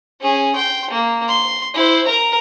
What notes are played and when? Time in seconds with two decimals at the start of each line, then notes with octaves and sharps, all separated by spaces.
0.21 C#4 G#4
0.55 G5 C6
0.91 A#3
1.28 C6
1.74 E4 C5
2.07 A#4 A#5